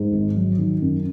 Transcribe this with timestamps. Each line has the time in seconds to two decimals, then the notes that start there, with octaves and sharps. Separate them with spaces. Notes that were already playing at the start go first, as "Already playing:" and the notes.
Already playing: G#2
0.12 G#1
0.35 F#3
0.58 D#3
0.81 F#2